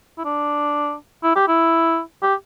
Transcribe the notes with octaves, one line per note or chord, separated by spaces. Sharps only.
E4
D4
E4
G4
E4
G4